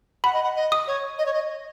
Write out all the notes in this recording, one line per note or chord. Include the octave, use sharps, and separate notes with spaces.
F#5 B5
D#5
F#5
D#5
D#6
C#5
D#5
C#5
D#5